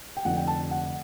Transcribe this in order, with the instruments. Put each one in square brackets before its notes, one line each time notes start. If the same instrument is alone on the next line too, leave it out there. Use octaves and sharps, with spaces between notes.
[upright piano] G5
F1 F2 D3 F#5
G5
A5
F#5